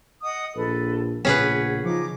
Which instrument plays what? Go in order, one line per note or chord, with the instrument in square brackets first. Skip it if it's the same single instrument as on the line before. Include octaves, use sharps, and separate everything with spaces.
[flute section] D#5 F#5 D#6
[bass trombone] A#1 [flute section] A4 B4
[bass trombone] A#1 [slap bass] C#3 B3 [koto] C#4 G#4 B4 [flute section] F#5
[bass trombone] F3 [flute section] D#4 D6